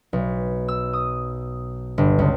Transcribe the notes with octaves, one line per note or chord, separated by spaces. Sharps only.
B1
E6
D#6
G1
C#2